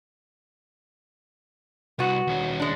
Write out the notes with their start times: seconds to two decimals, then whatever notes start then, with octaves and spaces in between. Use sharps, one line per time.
1.99 C2 B3 F#4
2.27 D#2 C#4
2.60 G#3 D4